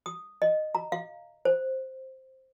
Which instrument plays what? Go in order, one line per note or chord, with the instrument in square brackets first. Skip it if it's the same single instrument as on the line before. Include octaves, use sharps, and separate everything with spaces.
[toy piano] D#6
D#5
A#5
F5
C5